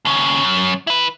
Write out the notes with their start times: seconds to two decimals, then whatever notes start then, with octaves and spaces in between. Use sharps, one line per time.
0.05 D#2 C#3
0.43 F#2
0.87 E4 B4